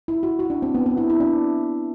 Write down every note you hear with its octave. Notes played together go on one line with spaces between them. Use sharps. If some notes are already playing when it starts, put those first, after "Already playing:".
E4
F#4
F#4
D4
C4
B3
B3
E4
E4
D4